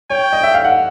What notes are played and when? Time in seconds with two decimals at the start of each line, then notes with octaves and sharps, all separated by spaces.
0.10 C#5 G5
0.33 D#5
0.43 E5
0.54 F5
0.64 F#5